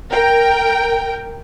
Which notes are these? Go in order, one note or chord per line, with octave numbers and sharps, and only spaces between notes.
A#4 G5